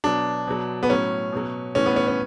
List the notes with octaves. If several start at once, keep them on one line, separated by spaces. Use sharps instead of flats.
B2 F#3 D4
B2 F#3
B3
A2 F#3 C#4
B2 F#3
A2 E3 C#4
B3
C#4
C#4